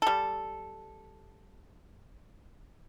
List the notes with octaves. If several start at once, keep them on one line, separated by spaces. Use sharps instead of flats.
G3 A4